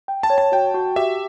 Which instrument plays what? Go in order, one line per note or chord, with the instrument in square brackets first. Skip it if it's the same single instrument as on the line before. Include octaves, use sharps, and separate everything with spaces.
[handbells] G5
[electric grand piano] A5
[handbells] C#5
[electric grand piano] A5
[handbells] F#4 [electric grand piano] G5
[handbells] F#4
[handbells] G4 [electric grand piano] E5